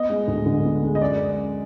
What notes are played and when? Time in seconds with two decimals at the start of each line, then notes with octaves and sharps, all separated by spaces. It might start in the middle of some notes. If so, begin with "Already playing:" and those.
Already playing: B3 D#5
0.10 G#3
0.28 D2
0.46 D3
0.64 B3
0.83 G#3
0.95 D#5
1.01 F#2 D5